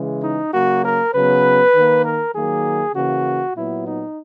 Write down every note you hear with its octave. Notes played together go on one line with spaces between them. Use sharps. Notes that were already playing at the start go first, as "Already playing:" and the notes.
Already playing: C#3 E3 G#3
D#4
C#3 F#3 A#3 F#4
A#4
C#3 F#3 B3 B4
D#3 A#3
A#4
D#3 F#3 A#3 G#4
C#3 E3 A#3 F#4
A#2 F#3 B3 E4
D#4